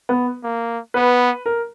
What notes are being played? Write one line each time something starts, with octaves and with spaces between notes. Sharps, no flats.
B3
A#3
B3 B4
A#4